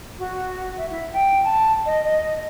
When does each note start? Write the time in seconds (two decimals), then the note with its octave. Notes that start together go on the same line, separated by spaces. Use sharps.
0.18 F#4
0.77 E5
0.90 E4
1.13 G5
1.43 A5
1.85 D#5
2.04 D#5